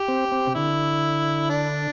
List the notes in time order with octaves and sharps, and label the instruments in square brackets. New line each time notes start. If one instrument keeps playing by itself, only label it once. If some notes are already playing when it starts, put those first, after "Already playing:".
Already playing: [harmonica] G4
[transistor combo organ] C4
C4
C3
[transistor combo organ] D3 [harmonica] E4
[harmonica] D4